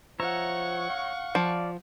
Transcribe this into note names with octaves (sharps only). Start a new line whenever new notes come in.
F3 C#5 E5 F#5 A#5 C#6
F5
F3 D5